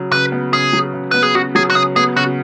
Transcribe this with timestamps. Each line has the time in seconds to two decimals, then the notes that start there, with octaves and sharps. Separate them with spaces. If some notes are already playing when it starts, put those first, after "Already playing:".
Already playing: C#3 F#3
0.12 C#3 B4
0.32 B3
0.53 C#3 G#4
0.73 F#3
0.94 C#3
1.11 B3 B4
1.23 G#4
1.35 C#3 F#4
1.55 F#3 G#4
1.70 F#4
1.75 C#3 G#4
1.96 B3 G#4
2.16 C#3 F#4